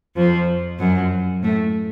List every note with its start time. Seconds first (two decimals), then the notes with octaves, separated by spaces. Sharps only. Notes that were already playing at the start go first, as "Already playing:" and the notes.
0.16 F2 F3
0.79 F#2 F#3
1.43 A2 A3